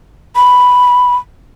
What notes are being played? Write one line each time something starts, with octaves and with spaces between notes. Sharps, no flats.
B5